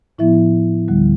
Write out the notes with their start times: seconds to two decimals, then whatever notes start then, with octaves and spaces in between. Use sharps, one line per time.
0.19 A2 F3 B3 E4 E5
0.88 D2 D3 G3